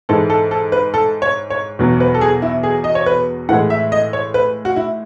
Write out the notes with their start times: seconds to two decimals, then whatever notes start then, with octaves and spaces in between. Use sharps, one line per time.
0.09 G#2 E3 G#3 A4
0.30 A4
0.51 A4
0.72 B4
0.94 A4
1.22 C#5
1.50 C#5
1.79 E2 B2 F#3
2.00 B4
2.14 A4
2.21 G#4
2.42 E4
2.63 G#4
2.84 D#5
2.95 C#5
3.06 B4
3.49 A2 E3 G#3 F#5
3.70 E5
3.92 D#5
4.13 C#5
4.34 B4
4.65 F#4
4.76 E4